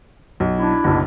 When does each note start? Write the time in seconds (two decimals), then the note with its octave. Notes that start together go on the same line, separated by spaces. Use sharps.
0.40 B1
0.58 D4 E4
0.84 F#1 B1